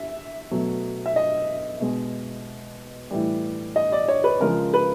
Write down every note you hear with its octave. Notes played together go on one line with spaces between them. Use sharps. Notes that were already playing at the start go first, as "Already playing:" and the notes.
Already playing: E5
B2 F#3 A3
E5
D#5
B2 G#3
A2 E3 G3
D#5
D5
C#5
B4
C#3 F3 G#3 A#4
B4